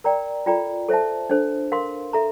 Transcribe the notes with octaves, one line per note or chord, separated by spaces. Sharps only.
A#4 D5 G5 A#5
F4 A4 D5 G5 A#5
A4 C5 E5 A5
D4 A4 C5
A#4 F5 C6
A4 E5 A#5